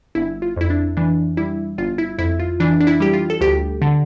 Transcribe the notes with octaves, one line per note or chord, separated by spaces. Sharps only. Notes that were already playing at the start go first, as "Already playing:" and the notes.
G1 E4
F4
F2 E4
D4
E3 D4
G3 E4
G1 F4
E4
F2 E4
F4
E3 D4
D4
E4
G3 G4
F4
A4
D2 G4
D3